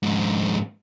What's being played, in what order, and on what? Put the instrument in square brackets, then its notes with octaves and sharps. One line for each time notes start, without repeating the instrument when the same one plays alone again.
[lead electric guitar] F2 G#2